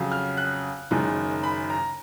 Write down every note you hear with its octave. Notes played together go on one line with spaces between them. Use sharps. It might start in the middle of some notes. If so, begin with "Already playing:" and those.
Already playing: F2 C#3 F#3
F6
F#6
F#1 F#2 D#3 G#3
B5
A#5